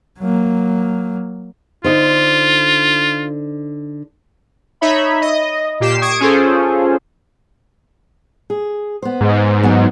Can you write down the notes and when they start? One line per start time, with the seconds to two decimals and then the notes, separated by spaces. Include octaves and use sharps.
0.20 F#3 A#3
1.84 D3 D#4 F4 C5
4.81 D#4 C#5 E5 B5
5.21 D#5
5.80 A#2 G4 C7 E7
6.01 C#6 D#6 G#6 D7
6.20 C#4 F4 G#4 A4 C5
8.50 G#4
9.02 B3 C5
9.21 G#2
9.63 F#3 B3